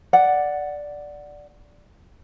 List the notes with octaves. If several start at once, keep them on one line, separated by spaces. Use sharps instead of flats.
D5 F#5